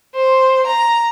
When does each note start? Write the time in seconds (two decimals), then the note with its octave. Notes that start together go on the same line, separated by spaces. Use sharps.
0.15 C5
0.66 A#5